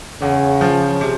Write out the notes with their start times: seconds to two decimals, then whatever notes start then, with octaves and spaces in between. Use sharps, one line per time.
0.22 E2 C#3
0.61 F3
1.01 C3